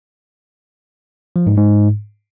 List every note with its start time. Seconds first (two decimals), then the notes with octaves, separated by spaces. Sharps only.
1.36 F3
1.47 G#2
1.58 G#2